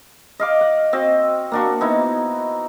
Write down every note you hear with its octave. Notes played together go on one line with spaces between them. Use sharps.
D#5 F5 D6
F#5
C4 F#4 D#5
A#3 D4 F#4
B3 D#4 E4